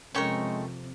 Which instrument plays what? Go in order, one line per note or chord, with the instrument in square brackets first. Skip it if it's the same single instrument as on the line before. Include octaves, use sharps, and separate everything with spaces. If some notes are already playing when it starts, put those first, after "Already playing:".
[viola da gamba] F2 C3 [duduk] G#3 [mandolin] A3 G5 C#6 [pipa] C#4 A#4